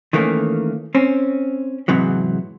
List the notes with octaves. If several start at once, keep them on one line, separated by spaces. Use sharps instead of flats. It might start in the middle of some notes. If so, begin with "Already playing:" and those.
D#3 E3 A3 A#3 C#4
C4 C#4
E2 G#2 C3 E3 F#3